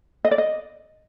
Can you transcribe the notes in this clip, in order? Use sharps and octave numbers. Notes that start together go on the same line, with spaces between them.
D#5
D5
D#5